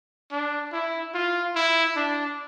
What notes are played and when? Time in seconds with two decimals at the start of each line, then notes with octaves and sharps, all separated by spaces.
0.32 D4
0.73 E4
1.14 F4
1.56 E4
1.96 D4